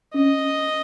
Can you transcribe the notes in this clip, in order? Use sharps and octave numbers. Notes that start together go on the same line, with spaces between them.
C#4 D#5